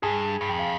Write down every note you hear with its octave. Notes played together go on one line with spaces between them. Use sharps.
G2 G#4 G#5
G2
F2 G5
F5